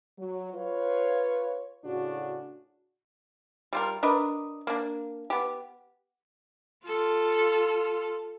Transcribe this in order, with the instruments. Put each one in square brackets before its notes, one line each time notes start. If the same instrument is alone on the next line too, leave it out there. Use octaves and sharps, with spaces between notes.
[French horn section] F#3
F4 B4 C#5
A2 C#3 D4 F#4
[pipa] G3 F4 A#4
D4 A#4 B4 D#5
A#3 D4
B3 G4
[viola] F4 A4